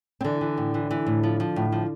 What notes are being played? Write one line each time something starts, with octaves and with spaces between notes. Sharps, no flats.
C4
D3 E3 D4
E3
A2
E3
E3
A2
F3
F3
A2
F3